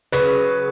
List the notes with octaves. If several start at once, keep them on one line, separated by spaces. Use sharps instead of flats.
C#3 F#3 B3 B4